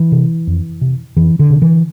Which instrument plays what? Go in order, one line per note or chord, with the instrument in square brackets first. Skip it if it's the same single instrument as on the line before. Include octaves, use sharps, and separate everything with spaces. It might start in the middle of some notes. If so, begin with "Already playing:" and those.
Already playing: [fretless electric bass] E3
C3
F2
C3
F2 E3
D3
C3
E3